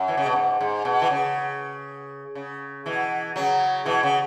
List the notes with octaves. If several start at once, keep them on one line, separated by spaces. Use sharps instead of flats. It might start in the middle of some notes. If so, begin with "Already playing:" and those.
Already playing: F#2
E3
C#3
B2
G#2
G#2
B2
E3
C#3
C#3
B2 E3
C#3 F#3
B2 E3
C#3